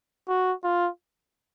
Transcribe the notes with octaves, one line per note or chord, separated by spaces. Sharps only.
F#4
F4